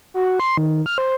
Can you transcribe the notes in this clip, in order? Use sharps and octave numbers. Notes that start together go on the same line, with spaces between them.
F#4
C6
D#3
F6
C5